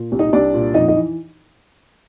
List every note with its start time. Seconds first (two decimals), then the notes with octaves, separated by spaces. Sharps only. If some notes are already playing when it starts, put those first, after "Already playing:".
Already playing: A#2
0.12 C2
0.19 D#4 D#5
0.33 C2 D4 D5
0.54 A#2
0.74 F2 D#4 D#5
0.88 D#4 D#5
0.95 E3